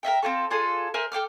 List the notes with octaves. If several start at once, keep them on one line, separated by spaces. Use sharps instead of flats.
A#4 D#5 E5 G5
C4 C#4 F4 A4
D4 F4 G#4 A4
A#4 C5 E5 G#5
A4 G5 D6 F6